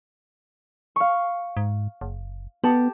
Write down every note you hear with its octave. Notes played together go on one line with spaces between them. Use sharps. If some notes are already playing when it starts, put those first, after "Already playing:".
F5 C#6
G#2
F#1
B3 G4 A5